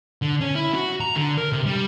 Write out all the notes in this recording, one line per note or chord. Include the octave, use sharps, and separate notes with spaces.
D3
C#4
E4
F#4
A#5
D3
A#4
C3
G3